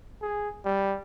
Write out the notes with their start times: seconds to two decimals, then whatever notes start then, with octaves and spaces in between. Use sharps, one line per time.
0.22 G#4
0.65 G3